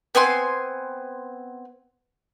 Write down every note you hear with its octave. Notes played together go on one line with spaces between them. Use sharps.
B3 C4 G#5 C6